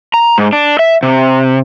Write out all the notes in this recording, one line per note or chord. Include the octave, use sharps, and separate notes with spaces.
A#5
G#2
D4
E5
C3